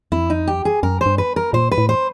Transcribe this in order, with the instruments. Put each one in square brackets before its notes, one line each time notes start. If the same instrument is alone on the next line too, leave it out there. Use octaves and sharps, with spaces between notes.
[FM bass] F2 [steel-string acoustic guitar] E4
[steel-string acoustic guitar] D#4
G4
G#4
[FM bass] F#2 [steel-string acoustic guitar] A#4
[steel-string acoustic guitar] C5
[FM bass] G2
[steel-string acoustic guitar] B4
A#4
[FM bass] A#2 [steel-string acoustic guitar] C5
[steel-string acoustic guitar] B4
[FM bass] A2
[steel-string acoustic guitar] C5